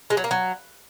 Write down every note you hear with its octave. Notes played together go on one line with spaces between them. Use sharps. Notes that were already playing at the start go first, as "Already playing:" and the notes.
G#3
F#3
A#3
F#3